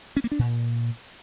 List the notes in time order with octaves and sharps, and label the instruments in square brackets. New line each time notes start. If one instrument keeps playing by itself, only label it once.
[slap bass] C#4
A#3
D4
A#2